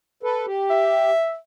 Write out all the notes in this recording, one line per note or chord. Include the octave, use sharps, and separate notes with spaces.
A4 B4
G4
E5